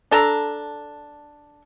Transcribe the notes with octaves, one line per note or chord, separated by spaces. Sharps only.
D4 A4 A#5